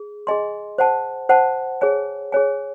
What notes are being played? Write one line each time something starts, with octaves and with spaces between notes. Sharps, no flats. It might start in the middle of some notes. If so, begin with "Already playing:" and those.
Already playing: G#4
G#4 D#5 G#5 C6
C5 F#5 A5
C5 F#5 A5
G#4 C#5 G#5
G#4 C#5 G#5